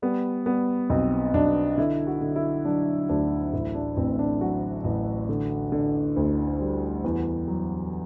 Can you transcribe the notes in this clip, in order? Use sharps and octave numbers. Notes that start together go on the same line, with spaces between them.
G3 B3
G3 B3
B1 C4
B1 D4
D3 E4
F#4
D3
E4
F#3 D4
D2 D4
A1 E4
D4
A1 C4
D4
F#3 F#4
A1
D3
D3
D2
G3
E2
F#3